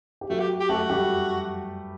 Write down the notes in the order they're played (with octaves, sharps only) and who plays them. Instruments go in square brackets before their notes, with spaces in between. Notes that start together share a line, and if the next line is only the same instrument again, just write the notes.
[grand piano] G4
[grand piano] F#3 F#4 [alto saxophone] A3
[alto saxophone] G4
G4
[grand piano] A3 A4 [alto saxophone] F#4
[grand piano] G3 G4